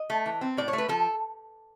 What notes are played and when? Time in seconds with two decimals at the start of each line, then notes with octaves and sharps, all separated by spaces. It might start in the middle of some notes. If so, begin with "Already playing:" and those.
Already playing: D#5
0.10 A3
0.26 E3
0.41 C4
0.57 A2 D5
0.68 C#5
0.73 A3
0.78 B4
0.88 F3 A4